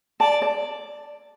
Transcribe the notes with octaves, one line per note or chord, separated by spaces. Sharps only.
D5 A5
D5